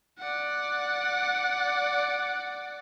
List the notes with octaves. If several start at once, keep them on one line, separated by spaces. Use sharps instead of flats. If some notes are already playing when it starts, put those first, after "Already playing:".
D5 F#5